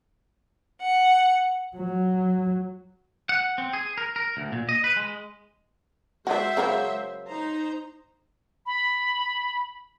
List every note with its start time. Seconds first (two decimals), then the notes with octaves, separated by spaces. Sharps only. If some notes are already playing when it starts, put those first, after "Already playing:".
0.81 F#5
1.77 F#3
3.29 F#5
3.58 C4
3.73 G#4
3.98 A#4
4.16 A#4
4.37 D2
4.52 A#2
4.69 D#5
4.84 B4
4.97 G#3
6.27 G#3 F#4 C5 D5 E5
6.57 C#3 F#3 A#3
7.27 D#4 C5 A#5
8.66 B5